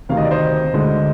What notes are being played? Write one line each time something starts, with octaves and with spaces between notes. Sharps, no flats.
D2 C3 D#3 F5
D#5
D5
C5 D#5
D2 D3 G#3